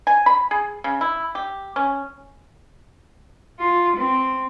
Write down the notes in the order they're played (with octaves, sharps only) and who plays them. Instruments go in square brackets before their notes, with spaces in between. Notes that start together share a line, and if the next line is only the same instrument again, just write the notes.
[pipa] G#5
B5
G#4
C#3
E4
G4
C#4
[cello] F4
C4